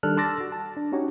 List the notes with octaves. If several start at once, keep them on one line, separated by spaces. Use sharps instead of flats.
D#3 G3 D4 A4 F6 F#6
A5 C6 D6 E6 A6 A#6
F#4
A5
D4
C#4 D#4 F#4 G4 C#5